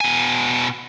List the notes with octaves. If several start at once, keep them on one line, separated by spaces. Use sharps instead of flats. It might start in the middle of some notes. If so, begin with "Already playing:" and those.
B2 G#5